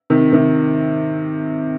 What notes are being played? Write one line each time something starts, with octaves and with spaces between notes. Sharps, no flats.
C3 D#3
C3 D#3